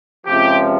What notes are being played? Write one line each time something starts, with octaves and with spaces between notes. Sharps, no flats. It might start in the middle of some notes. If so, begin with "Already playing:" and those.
C#2 C3 F3 G4